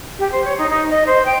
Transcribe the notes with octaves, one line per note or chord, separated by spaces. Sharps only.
G4
C5
C#5
D#4
D#4
D#5
C5
G5